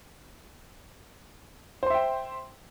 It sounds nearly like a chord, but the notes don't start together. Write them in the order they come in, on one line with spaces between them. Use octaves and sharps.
C5 C6 E5 G5